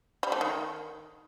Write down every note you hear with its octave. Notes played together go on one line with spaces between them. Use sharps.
G3
A3
D#3